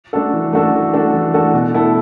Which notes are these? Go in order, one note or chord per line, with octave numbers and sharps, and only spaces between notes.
A3 D4 F#4 A4
E3
A3 D4 F#4 A4
E3
A3 D4 F#4 A4
E3
A3 D4 F#4 A4
B2
A3 E4 A4